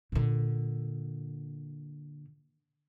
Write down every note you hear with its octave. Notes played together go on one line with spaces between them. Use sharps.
A#2 D3